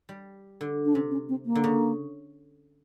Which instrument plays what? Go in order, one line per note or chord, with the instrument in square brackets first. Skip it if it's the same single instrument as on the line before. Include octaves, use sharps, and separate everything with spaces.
[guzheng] G3
D3
[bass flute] D4
[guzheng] C3 [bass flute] C#4
[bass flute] C#4
C4
A#3
[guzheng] D3
C#3